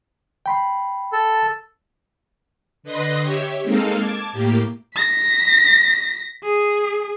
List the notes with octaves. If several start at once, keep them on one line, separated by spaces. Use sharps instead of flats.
G5 B5 C6
A4
D3 B4 D#5 C6 A#6
G4 C#5 E5
G#3 A#3 C4 D#4 A4 F5
A5 D6 G#6
A2 A#3 G4
A#6 B6
G#4